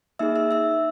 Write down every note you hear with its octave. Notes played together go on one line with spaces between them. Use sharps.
A#3 D#4 G#4 E5 E6
E5 E6
E5 E6